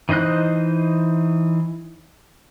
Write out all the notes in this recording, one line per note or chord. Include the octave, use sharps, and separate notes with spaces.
E3 D#4 C5 D#5 F#6